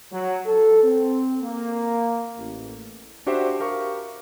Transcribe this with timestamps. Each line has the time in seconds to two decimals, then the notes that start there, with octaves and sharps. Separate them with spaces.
0.12 F#3
0.45 A4
0.82 C4
1.42 A#3
2.37 A1
3.26 D4 F#4 G4 C5 E5
3.60 G4 A#4 F5 C#6